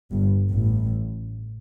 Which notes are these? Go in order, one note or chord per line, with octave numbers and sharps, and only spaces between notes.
G1 G2
A1 A2